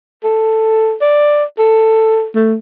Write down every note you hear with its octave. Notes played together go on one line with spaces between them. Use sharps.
A4
D5
A4
A3